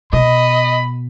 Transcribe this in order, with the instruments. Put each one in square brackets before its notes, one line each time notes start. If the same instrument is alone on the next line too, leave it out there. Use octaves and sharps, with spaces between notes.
[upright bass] B2 [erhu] D#5 [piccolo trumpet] B5